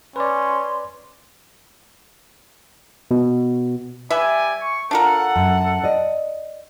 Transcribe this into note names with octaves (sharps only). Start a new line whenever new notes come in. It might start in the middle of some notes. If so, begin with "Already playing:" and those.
C#4 B4 D5 C6
B2
G3 B4 D5 E5 G#5
C#6
D4 F4 A4 A#4 F#5
F#2
D5 D#5